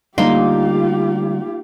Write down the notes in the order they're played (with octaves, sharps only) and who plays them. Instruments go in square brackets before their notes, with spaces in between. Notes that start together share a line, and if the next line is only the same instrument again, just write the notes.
[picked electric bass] D3 G3 A3 [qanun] A#3 D#4 C6 [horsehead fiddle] F4 G4